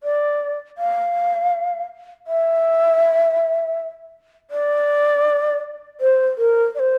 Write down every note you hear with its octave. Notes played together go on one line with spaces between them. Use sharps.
D5
F5
E5
D5
C5
A#4
D5
C5